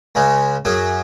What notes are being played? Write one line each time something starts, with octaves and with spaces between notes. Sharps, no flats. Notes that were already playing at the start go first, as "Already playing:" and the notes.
C#2 C#3 G#3 C#4
F#2 F#3 C#4 G#4